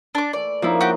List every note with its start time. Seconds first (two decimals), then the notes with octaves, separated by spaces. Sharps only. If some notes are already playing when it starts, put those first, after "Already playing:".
0.15 D4 D6
0.33 E3 A3 D5
0.62 C#3 F3 A#3 D#4 E4
0.81 F#4 G4